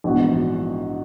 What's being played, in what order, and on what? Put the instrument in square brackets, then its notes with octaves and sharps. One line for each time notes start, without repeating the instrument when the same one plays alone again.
[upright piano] A#1 G#2 E3 B3 F#4